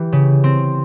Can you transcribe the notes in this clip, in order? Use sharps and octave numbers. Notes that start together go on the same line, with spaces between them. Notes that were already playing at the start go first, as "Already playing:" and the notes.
Already playing: E3 G4
C#3
C4